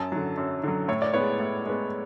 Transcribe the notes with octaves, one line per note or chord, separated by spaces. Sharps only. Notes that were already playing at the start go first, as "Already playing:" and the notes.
Already playing: F#2 A5
D3 F#3
F#2
D3 F#3
A2 C#5
D5
G#3 B3 C#5
A2
G#3 B3